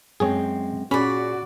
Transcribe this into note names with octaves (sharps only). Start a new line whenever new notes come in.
F#2 G#3 C4 G#4 C#5
A#2 C#4 F#4 G#4 D5 B5